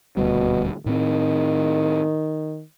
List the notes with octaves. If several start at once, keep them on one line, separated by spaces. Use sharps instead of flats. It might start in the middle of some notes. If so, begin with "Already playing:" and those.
D#1 D2 B2 G3
A2 D#3 C4